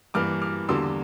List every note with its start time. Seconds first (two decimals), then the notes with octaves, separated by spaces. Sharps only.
0.14 G2 E3 A#3 D6 F6
0.42 D6 F6
0.68 E2 D3 G3 A#3 C6 E6